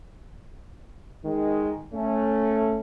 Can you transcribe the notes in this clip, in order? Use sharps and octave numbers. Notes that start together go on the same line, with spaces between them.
D#3 G#3
A3 C#4